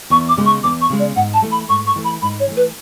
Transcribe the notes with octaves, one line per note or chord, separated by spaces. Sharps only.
E2 C#6
D6
C#3 G#3
C#6
E2 D6
C#6
C#3 G#3
D5
G#2 F#5
A5
E3 A3
B5
G#2 C#6
C#6
E3 A3
B5
G#2 B5
C#5
E3 A3
B4